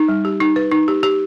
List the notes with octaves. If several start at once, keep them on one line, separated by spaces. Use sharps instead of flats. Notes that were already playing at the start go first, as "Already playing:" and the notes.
Already playing: D#4
G3
G4
D#4
B4
D#4
G4
G4